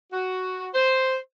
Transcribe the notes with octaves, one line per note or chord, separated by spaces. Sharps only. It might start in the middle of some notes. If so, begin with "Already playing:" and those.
F#4
C5